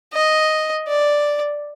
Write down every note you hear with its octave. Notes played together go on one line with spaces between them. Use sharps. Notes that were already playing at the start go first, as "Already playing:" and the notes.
D#5
D5